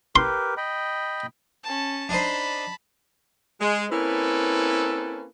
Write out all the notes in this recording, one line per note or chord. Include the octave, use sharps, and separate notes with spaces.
G4 A#4 B4 C6
D#5 G5 B5
C#4 A5
D4 D#4 C5 A5 B5
G#3
A#3 C4 C#4 E4 A4 B4